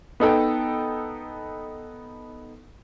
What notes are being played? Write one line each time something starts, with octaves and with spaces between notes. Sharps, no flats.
B3 D#4 A4 G5